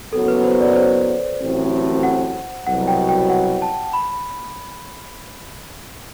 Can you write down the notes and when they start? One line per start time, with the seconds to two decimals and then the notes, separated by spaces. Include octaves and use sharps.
0.12 F#1 F#2 F#3 B3 A4
0.28 B4
0.44 C5
0.61 D5
0.76 C5
1.39 A1 A2 F#3 C4
2.03 F#5
2.66 C2 B2 F#3 F#5
2.88 G5
3.09 G5
3.30 F#5
3.62 A5
3.93 B5